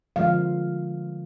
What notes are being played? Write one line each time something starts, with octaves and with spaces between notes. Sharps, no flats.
D3 F3 G#3 F5